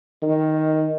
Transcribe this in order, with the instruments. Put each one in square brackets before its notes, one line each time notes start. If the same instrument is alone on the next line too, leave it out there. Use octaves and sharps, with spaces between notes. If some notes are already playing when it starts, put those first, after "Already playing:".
[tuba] D#3